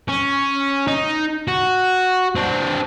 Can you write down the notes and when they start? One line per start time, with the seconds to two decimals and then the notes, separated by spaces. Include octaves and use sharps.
0.08 C#4
0.87 D#4
1.48 F#4
2.35 C4 D4